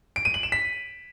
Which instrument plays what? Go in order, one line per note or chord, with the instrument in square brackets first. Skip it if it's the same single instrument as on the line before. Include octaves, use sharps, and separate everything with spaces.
[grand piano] D7
D#7
F#7
E7
B6